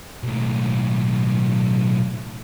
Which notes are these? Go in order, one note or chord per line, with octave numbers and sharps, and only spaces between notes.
B1 A2